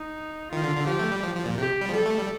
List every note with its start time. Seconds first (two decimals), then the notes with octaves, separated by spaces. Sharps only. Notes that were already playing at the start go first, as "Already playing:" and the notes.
Already playing: D#4
0.52 D#3 F4
0.64 D3
0.76 D3
0.87 F3 G4
0.99 A3
1.11 G3
1.23 F3
1.35 F3
1.46 A#2
1.58 C3 G4
1.81 G3
1.89 F3
1.93 G3 A4
2.06 A3
2.18 G3